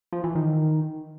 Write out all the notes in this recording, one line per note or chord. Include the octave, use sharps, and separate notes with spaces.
F3
E3
D#3